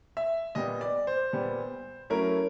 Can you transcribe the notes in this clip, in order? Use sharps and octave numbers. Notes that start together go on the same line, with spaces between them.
E5
A#2 G3 B3 D#5
D5
C5
A#2 G3 B3
F#3 A3 C#4 E4 A#4